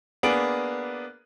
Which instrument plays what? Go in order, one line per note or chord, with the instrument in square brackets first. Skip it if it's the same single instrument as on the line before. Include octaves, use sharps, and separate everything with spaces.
[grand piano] A#3 B3 D4 G#4 D7 F#7